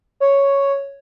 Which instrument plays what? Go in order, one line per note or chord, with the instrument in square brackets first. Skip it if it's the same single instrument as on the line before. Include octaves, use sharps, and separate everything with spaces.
[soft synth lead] C#5